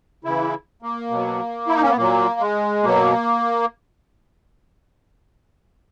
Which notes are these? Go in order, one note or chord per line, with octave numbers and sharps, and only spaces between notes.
C#3 E3 E4
A#3
B2 F#3
E4
D#4
C#4
B3
A#2 F#3 A#3
G#3
B2 F#3 A#3